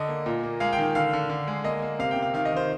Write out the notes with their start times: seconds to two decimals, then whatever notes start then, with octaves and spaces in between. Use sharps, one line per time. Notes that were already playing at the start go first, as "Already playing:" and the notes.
Already playing: D3 D#5
0.09 A#3
0.26 A#2
0.43 A#3
0.60 G#3 F5
0.73 G5
0.78 D#3
0.95 D3 F5
1.13 D3
1.29 D3
1.47 G#3
1.64 A#3 D#5
1.82 A#3
1.99 C3 F5
2.11 G5
2.16 C3
2.22 F5
2.34 D#3 F5
2.45 D#5
2.52 D#3 C5